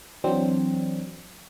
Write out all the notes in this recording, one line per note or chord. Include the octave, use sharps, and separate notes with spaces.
E3 F#3 C4 D4